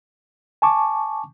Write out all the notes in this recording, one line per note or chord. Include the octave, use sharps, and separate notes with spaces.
G#5 A5 C#6 D6